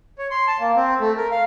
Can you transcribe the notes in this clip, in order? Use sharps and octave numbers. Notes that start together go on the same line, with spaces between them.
C#5
C6
A5
A#3
C4
A3
A#4
F5